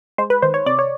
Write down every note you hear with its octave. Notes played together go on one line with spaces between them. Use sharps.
G#3 C5
B4
D#3 C5
C#5
C3 D5
C#5